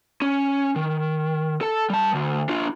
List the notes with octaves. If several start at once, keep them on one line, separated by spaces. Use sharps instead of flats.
C#4
D#3
A4 A5
G3 A5
D2
D4 F4